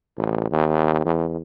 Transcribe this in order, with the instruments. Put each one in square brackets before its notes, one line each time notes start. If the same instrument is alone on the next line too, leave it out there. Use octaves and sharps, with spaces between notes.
[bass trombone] A1
D#2
E2